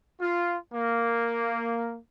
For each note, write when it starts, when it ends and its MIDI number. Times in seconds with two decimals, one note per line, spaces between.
0.21 0.57 65
0.74 1.98 58